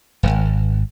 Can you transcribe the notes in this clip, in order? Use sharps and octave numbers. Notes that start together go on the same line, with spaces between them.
D#1 G#1